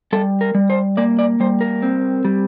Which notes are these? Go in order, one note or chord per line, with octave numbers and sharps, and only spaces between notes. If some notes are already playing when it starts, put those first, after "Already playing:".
G3 A4
A#4
G3
C5
A#3 D5
D5
G3 C5
A#4
C4
G3